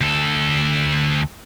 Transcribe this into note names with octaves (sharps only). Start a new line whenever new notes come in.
D2 A4